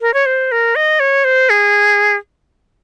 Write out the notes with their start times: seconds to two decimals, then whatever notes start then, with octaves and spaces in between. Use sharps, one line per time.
0.01 A#4
0.14 C#5
0.26 C5
0.52 A#4
0.76 D#5
1.00 C#5
1.24 C5
1.50 G#4